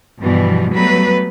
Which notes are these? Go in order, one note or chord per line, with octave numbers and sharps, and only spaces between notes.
G2 B2 E3 F3 G3
F#3 G3 A3 B3 B4